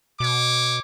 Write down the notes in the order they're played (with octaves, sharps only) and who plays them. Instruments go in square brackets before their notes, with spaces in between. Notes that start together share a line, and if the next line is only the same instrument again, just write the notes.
[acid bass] B2 [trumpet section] C#5 D6